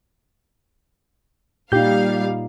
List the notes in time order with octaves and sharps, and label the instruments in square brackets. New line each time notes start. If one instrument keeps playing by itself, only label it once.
[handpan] A#2 D#4 [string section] G3 F5 [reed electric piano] G4 G6